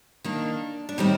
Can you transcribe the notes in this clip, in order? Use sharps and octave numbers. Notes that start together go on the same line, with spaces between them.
D#3 A#3 D4
D4
A2 D#3 G3 C4 D#4